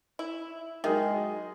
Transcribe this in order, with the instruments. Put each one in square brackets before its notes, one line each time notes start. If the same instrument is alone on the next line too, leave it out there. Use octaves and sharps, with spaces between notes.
[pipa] E4
[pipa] D#3 [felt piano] F#3 G#4 D#5 [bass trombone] G#3